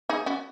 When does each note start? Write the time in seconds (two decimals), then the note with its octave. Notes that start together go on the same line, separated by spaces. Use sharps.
0.09 D#4 G#4
0.26 C#4 F#4